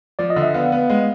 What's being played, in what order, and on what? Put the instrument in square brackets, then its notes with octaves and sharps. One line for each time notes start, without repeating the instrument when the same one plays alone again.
[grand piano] F3 [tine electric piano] D5
[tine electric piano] D#5
[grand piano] D3
[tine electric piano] E5
[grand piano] B3 [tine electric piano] F5
[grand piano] B3
G#3